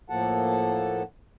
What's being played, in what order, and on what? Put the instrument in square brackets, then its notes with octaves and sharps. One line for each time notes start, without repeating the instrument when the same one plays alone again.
[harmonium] A2 F3 A#3 A4 F#5 A5